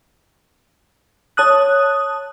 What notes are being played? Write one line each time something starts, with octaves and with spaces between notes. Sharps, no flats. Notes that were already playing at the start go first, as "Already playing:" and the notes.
C#5 A5 D#6 F#6